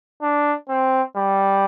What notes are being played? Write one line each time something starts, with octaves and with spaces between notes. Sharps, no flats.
D4
C4
G3